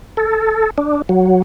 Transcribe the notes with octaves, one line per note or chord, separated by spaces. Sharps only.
A4
D4
F#3